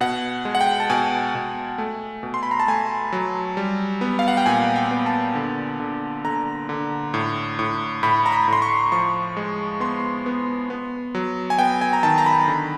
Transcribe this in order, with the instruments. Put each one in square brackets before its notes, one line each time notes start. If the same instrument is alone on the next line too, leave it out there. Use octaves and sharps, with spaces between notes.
[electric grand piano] B2 F#5
G#3
F#5
G5
A5
B2 G#5
B2
A3
B2
C6
B5
A#5
A5
A3 G#5
F#3
G3
B3
F5
F#5
G5
A#2 G#5
G5
B3
A5
D3
D3
D3 A#5
D3
A2
A2
A2 B5
A#5
B5
A2 C6
C#6
F3 C#6
G#3
B3 C6
B3
B3
F#3
G#5
B3 G5
G#5
A#5
D#3 A5
A#5
B5
D3